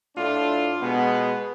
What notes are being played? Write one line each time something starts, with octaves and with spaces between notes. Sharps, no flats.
A2 A3 D4 F4
B2 G#3 B3